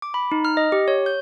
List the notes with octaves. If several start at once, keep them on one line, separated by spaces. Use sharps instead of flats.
D6
B5
D#4
F6
D#5
G4
C#5
G6